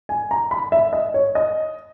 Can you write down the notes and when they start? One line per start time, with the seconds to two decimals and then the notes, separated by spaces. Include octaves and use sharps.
0.09 G#5
0.31 A#5
0.51 B5
0.72 E5
0.93 D#5
1.14 C#5
1.35 D#5